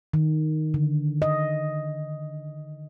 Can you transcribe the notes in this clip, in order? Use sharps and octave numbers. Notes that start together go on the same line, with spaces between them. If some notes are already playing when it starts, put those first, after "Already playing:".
D#3
D3
D#5